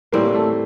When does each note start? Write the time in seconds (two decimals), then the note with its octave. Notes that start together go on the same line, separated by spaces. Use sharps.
0.13 A2 E3 G3 A#3 C4
0.35 A3